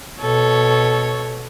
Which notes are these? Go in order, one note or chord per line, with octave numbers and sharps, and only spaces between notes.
B2 A4 C#5